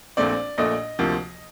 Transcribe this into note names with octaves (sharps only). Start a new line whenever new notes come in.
A#1 A#2 A3 C4 D5
A#1 A#2 A3 D#5
D2 C3 F3 A#3